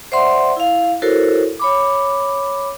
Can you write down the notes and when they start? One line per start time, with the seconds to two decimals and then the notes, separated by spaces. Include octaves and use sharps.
0.12 C5 D5 E5 F#5 C6
0.57 E4 F5
1.02 E4 F#4 A4 A#4 C5 C#5
1.60 C#5 B5 D6